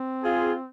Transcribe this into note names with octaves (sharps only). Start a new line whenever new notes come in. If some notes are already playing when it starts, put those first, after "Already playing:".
Already playing: C4
F4 G#4